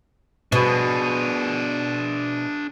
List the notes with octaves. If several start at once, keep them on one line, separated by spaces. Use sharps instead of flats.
B2 D4 G#4